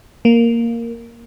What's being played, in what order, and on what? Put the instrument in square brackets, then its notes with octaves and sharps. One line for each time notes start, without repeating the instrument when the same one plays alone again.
[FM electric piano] A#3